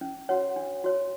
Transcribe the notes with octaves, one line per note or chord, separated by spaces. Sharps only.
C#4
F#4 C#5 F#5
D4
F#4 C#5